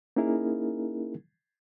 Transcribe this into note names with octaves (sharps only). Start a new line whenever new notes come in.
A#3 C#4 D#4 E4 G#4 A#4